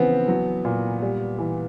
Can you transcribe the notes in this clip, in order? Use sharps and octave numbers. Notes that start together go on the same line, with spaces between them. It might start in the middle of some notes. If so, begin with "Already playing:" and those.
Already playing: C#3 E3 F3 B3 C4
F#3
A#2
G3
E3